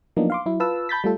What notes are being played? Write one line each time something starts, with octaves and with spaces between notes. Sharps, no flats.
F3 F#3 A#3 B3 D4 D#4
F5 C6 D6
F#3 E4
F4 B4 F5 A5 E6
A5 B5 G6 A6 B6
G3 A3 F4 A4